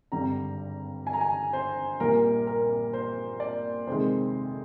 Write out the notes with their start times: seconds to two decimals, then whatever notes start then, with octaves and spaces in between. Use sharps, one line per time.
0.12 G#1 G2 D3 G3 A#5
1.07 G#5
1.13 A#5
1.21 G#5
1.53 C5
2.00 A#1 A#2 G3 A#4
2.47 A#4
2.93 C5
3.40 D5
3.87 F2 C3 D#3 G#3 C5